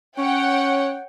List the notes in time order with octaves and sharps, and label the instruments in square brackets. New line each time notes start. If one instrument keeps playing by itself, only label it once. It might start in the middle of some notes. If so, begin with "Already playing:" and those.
[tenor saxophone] C#4 [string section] C#5 F#5 G5